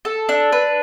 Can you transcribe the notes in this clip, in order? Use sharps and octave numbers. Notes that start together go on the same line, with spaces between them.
A4
D4
B4